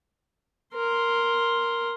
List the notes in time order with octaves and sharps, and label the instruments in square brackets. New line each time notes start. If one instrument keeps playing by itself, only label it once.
[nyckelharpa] A#4 C6